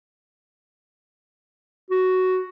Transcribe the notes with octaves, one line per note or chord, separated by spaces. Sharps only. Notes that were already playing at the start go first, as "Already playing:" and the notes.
F#4